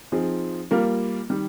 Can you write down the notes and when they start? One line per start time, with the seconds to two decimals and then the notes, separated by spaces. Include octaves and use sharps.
0.12 F3 C4 D#4 G#4
0.71 G3 A#3 F4 A#4
1.30 D#3 G3